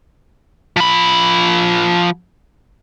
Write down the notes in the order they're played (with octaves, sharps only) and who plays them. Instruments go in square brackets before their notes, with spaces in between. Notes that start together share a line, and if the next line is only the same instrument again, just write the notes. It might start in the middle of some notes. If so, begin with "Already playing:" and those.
[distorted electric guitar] F3 B5